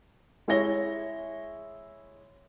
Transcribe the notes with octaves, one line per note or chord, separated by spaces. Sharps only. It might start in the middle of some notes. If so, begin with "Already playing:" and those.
G#3 E4 G#4 C#5 A#6 G7